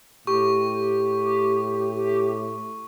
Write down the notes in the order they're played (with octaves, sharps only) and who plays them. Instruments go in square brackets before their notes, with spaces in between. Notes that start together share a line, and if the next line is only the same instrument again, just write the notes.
[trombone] A2 [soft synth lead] G4 [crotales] C#6